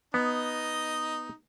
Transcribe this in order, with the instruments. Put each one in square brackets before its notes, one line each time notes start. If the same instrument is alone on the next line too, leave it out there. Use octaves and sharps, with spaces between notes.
[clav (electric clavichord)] B3 [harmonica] D#4 D#5